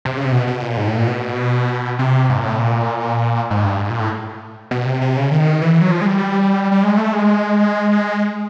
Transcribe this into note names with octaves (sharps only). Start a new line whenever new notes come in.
C3
C#3
C3
B2
B2
A#2
G#2
A2
A#2
B2
C3
G#2
A#2
A2
A#2
G#2
G2
G#2
A#2
A2
B2
C3
C3
C#3
D#3
E3
F#3
F3
G#3
G3
G3
G#3
A3
G#3